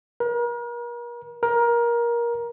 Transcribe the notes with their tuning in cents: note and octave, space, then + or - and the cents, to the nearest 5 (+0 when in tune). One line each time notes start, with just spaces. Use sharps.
A#4 +40
A#4 +20